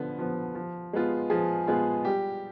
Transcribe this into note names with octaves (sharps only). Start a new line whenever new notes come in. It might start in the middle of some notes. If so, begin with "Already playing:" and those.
Already playing: D3 F3 B3
F3 B3
F3
G#3 B3 F4
F3 G#4
G#3 B3 F4
G3 G4